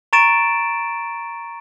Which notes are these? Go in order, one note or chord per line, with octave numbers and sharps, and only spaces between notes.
A#5 C#6 A6 D7 E7